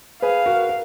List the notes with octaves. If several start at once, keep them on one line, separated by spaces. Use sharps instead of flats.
G#4 B4 F5
F#4 A#4
A#4